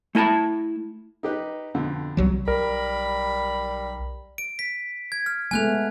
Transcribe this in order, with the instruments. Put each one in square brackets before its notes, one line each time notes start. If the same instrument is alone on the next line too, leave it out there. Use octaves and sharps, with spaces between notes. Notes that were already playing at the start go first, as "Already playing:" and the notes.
[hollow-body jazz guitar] A3 E4 G#5 A5 B5
[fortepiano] D#4 G4 B4
F2 B2 D3
[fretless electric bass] C2 F#3 G3
[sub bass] B1 [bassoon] G3 [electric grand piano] A#4 [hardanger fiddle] B5
[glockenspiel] D7
B6
G#6
F6
[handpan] G#3 A3 B3 [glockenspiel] G#5 F#6 F7